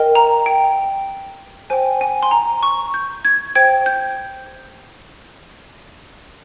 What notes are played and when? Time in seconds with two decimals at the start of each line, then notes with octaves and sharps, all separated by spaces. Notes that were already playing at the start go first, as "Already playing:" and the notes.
Already playing: A#4 D#5 G5
0.15 A#5
0.46 G5
1.70 C5 G5 G#5
2.01 G#5
2.23 C6
2.31 A#5
2.63 C#6
2.94 G6
3.25 G#6
3.55 C5 G5 G#6
3.86 G6